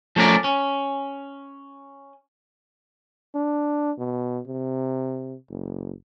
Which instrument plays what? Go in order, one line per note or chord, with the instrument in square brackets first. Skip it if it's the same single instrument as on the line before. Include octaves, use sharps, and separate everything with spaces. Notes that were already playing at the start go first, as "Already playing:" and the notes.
[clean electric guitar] F3 A3 C#4 A#4 D5
C#4
[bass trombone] D4
B2
C3
F#1